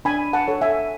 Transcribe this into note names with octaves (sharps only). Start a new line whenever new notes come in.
D4 G#5 B5
F#5 A5
A4 C#5
E5 G#5